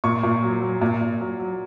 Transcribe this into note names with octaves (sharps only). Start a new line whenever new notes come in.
A#2 C#6
A#2
F#3
F#3
A#2
A#2
F#3
F#3